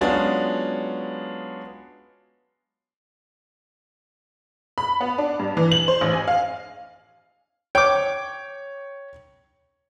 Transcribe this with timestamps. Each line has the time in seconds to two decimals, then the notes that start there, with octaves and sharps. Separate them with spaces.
0.01 F#3 G#3 B3 C#4 D4 F4
4.78 B5
5.01 B3
5.18 D4
5.40 G2
5.57 E3
5.72 F#7
5.88 C5
6.01 A1
6.13 G#5
6.28 F5
7.75 C#5 G5 D6